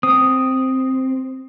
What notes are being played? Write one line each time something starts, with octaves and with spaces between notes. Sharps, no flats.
C4 D#6